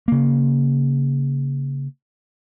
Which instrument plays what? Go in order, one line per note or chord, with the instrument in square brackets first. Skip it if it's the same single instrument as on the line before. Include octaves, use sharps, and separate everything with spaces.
[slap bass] C#3 A#3